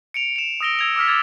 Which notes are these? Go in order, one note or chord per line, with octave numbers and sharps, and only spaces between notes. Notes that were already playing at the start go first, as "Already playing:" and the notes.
C#7 D7 F7
E7 F7
D#6 E6 A#6 D7 G7
E6 G#6 F7
D6 E6 F6 B6
D6 F6 G#6 A6 F7